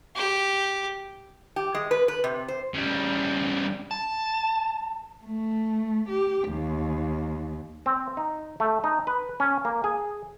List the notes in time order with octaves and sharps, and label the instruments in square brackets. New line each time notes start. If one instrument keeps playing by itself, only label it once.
[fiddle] G4
[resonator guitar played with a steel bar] G4
G#3
B4
B4
C3
C5
[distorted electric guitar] C#3 G3
[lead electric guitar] A5
[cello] A3
G4
D#2
[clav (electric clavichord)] C4
D#4
A3
D#4
B4
C#4
A#3
G#4